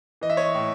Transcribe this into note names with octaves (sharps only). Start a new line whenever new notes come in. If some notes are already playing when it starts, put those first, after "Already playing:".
E3 D#5
E5
C#5 D#5
A2